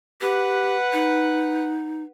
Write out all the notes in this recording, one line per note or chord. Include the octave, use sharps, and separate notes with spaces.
G4 B4 F#5
D#4